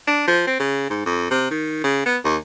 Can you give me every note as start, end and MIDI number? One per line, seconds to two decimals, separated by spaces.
0.08 0.24 62
0.27 0.43 53
0.47 0.57 60
0.60 0.86 49
0.90 1.02 44
1.06 1.28 41
1.31 1.47 48
1.51 1.82 51
1.84 2.03 49
2.06 2.17 59
2.24 2.37 39